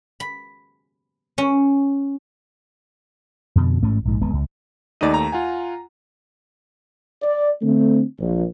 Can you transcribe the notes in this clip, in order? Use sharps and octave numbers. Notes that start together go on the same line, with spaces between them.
B5
C#4
F2 B2 D3
A1 G#2 A3 C#4
A#1 G#2
D1 G#3 B3
C#2
D#2 A3 D#4 D5 D#7
A#5
F4 F#5 G#5
D5
D3 A3 C4
A#1